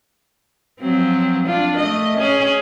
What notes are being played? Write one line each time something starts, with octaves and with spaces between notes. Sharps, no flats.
F3 F#3 C4
D4 F4
A3 D#5
C#4 G#4